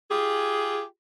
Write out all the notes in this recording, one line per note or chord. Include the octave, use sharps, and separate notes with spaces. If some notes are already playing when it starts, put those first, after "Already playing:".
F4 G4 G#4